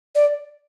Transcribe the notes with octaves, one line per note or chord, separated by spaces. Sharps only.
D5